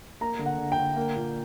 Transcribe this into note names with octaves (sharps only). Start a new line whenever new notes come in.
A#3 A#5
D3
F#5
D3
G5
D3
A#3
A#2